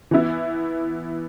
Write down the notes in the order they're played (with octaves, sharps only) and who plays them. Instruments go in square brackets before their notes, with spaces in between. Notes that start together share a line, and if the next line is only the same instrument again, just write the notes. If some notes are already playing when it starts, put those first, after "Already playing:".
[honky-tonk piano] E3 B3 E4